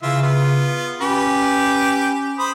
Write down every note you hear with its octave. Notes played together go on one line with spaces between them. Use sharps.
C#3 E3 F4 E5
B3 F4
C#4 G4 B4
C5 B5 D#6